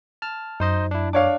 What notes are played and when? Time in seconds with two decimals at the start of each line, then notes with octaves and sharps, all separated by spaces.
0.22 A5 F6
0.60 F#2 D#4 C5 D#5
0.91 D4 E4
1.13 D4 C#5 F5 D6